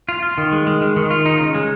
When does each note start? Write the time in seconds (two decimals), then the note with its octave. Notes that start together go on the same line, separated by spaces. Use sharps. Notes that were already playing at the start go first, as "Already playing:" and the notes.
0.09 F4
0.23 F4
0.38 D#3
0.52 G#3
0.67 G#3
0.81 D#3
0.96 D#3
1.11 F4
1.26 D#4
1.40 C#3
1.55 G#3